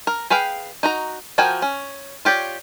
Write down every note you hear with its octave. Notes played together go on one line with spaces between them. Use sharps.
A#4
G#4 B4 F5 G5
D#4 F#4 A#5
F3 F#4 A#4 G5 G#5
C#4
F4 G4 C#5 D5